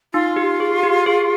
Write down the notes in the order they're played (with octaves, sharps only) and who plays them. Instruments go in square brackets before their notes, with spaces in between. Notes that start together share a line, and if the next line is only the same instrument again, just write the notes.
[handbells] D#4 [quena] F4
[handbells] G4
G#4
G4
G#4